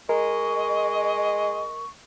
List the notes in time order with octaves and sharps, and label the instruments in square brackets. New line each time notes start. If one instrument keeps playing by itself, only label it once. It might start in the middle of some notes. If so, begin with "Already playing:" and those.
[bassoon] G#3 [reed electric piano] A#4 [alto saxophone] D#5 [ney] C#6